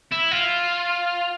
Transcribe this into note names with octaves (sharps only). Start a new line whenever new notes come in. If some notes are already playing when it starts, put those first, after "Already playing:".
E4
F4